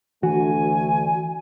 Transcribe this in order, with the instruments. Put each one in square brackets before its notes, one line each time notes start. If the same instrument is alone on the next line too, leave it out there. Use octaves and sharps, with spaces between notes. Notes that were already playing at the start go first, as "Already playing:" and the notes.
[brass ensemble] D2 A3 [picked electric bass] E3 [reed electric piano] F#4 [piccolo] G#5